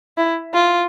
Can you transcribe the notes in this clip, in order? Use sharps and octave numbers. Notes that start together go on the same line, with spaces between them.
E4
F4